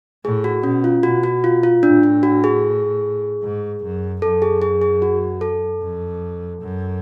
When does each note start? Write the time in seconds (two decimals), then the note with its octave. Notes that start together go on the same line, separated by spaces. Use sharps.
0.24 A2 G#4
0.44 F#4
0.63 B2 C#4
0.84 F4
1.03 B2 F#4
1.23 F#4
1.44 F4
1.63 F4
1.83 A2 D4
2.03 D4
2.23 F#4
2.44 G#4
3.43 G#2
3.83 F#2
4.22 F#2 A4
4.42 G#4
4.62 G#4
4.81 G#4
5.02 F#4
5.41 A4
5.82 F2
6.61 F#2